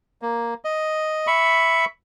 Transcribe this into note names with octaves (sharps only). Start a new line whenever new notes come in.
A#3
D#5
E5 B5 C#6